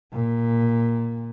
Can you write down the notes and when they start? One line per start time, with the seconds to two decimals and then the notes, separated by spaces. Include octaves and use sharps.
0.12 A#2